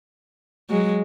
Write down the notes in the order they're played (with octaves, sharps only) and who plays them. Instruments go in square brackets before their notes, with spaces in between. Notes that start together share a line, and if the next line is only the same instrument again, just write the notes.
[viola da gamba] F#3 G#3